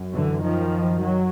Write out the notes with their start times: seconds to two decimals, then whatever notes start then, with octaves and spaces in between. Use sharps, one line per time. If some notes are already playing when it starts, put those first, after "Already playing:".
Already playing: F#2
0.14 D3 E3
0.44 D#3 F3
1.02 F#3